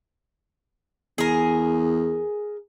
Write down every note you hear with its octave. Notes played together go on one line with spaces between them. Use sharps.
E2 G#4 A#4